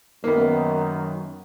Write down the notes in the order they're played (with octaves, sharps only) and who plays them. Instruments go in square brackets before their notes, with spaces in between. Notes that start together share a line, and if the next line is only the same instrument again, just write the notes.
[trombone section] F#2 D#3 [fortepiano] A#3 B3